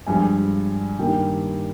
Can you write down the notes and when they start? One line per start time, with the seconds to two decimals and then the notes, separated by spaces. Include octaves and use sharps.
0.07 G2 F3 G#3 G#5
0.98 G2 D#3 G3 A#3 G5